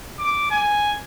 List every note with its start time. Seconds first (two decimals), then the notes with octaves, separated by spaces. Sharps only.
0.19 D6
0.51 G#5